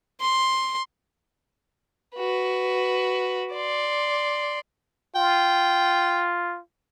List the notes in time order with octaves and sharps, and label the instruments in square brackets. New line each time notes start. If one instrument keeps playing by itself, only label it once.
[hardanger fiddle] C6
[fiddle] F#4 B4
D5 C6
[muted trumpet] F4 [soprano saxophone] G5